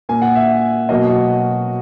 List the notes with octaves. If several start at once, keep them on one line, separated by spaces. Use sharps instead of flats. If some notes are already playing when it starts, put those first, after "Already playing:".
A#2 A#3 G#5
F#5
E5
B2 F#3 A#3 D#5
F#4